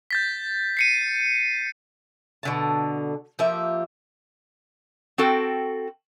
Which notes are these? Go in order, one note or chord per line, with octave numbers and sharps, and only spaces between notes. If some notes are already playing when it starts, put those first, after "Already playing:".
G6 A6 B6
C7 C#7 D#7
B2 D3 A5
F3 A#3 G4 E5
C4 F#4 A4 G5